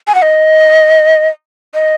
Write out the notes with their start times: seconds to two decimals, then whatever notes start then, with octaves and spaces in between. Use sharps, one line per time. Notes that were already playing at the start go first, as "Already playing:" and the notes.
0.07 G#5
0.15 F#5
0.23 D#5
1.74 D#5